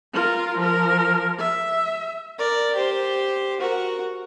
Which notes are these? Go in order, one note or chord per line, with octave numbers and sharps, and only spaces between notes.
F4 A#4
F3 A#4
E5
A#4 D5
G4 C5
F#4 A#4